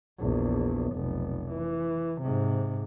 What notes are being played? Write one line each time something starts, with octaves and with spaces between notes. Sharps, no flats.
A#1 E2
F1 B1
E3
G#2 C3